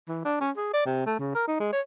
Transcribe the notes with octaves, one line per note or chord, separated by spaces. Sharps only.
E3
D4
C#4
G#4
D5
C3
A3
C#3
A#4
D#4
G#3
C#5